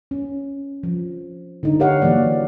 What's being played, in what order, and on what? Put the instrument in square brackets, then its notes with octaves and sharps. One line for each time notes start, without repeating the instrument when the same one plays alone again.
[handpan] C#4
F3
D3 D4 D#4
G4 A#4 C#5 F5 F#5
E3 F#3 A#3 D5